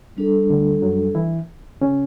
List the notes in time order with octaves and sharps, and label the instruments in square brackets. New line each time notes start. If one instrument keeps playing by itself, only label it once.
[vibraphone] G3 D4 A4
[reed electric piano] D2 D3
F#2 F#3
E3 E4
C#3 C#4